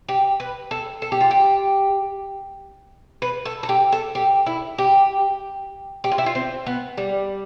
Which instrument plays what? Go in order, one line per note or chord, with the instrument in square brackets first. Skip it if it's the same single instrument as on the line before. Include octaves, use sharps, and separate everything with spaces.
[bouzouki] G4
B4
A4
A4
G4
F4
G4
B4
A4
A4
G4
A4
G4
E4
G4
G4
F4
E4
F4
C4
B3
G3